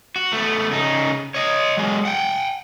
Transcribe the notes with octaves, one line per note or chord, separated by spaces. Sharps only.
F#4
A3 B3
C#3 D#4
C#5 D#5
F#3 G#3
F#5 G5